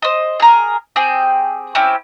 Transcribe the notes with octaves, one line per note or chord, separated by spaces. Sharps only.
C5 D#5
G#4 A#4
C4 G4 G#4 G5
C4 C#4 E4 G4